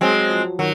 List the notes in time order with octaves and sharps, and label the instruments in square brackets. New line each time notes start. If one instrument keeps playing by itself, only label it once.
[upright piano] F#3 [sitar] G#3 C4
[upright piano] F3
[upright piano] D#3 [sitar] F#3